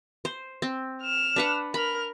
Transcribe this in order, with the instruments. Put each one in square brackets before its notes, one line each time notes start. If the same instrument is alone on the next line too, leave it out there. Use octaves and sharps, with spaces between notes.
[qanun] C5
C4
[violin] F6 E7
[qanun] D4 B4 F#5
[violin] A#4 F6 [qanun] B5